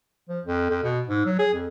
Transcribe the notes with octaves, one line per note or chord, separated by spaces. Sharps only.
F3
F2
F2
B2
G#2
F#3
G#4
F2